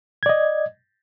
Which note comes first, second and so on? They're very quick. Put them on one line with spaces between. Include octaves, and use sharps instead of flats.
G#6 D5 D#5